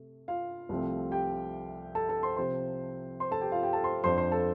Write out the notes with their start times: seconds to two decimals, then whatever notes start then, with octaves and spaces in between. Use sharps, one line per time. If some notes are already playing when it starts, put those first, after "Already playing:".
Already playing: C3 A3
0.28 F4 F5
0.69 C2 C3 F3 A3 C4
1.11 G4 G5
1.95 A4 A5
2.09 A4 A5
2.23 C5 C6
2.37 C3 F3 C4 C5 C6
3.20 C5 C6
3.31 A4 A5
3.41 G4 G5
3.52 F4 F5
3.62 G4 G5
3.73 A4 A5
3.84 C5 C6
4.04 F2 F3 D4 C5 C6
4.18 C5 C6
4.32 A4 A5